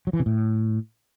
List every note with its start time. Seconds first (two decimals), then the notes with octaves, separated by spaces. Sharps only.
0.07 F#3
0.13 E3
0.20 C3
0.26 A2